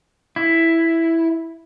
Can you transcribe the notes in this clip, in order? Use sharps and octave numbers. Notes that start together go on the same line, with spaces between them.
E4